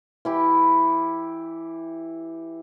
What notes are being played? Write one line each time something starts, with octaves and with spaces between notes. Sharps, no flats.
E3 E4 G4